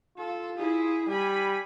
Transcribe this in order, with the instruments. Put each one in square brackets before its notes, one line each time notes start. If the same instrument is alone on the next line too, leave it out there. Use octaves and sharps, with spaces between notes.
[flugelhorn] F4 [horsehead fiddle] A4
[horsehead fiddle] E4 G#4
[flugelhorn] G3 [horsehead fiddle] G#5 B5